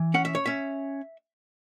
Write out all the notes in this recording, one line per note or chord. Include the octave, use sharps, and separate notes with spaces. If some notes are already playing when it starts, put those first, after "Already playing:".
Already playing: E3
C#4 F#5
E5
C#5
C#4 E5